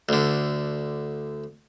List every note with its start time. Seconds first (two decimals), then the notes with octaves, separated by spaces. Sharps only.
0.09 D2 D3